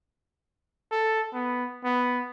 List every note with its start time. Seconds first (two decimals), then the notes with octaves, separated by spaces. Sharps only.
0.91 A4
1.33 B3
1.84 B3